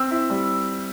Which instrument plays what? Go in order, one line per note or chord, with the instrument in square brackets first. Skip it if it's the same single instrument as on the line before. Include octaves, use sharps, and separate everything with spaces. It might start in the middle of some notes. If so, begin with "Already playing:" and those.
Already playing: [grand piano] C4 E6
E4
G3